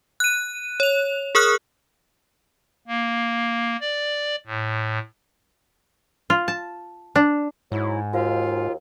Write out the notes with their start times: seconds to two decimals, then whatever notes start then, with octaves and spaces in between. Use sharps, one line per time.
0.20 F#6 D#7
0.80 C#5 F7
1.35 G#4 A#4 C#6 D#6 F6 F#6
2.87 A#3
3.81 D5
4.46 A2
6.30 F4
6.48 A5
7.16 D4
7.72 G#2 F#3 E4
8.13 D#2 F4 F#4 C5 F5